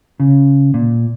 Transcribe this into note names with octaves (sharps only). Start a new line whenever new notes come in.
C#3
A#2